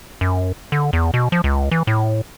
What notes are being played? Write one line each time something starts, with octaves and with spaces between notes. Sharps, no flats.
F#2
D3
E2
B2
F3
C#2
E3
A2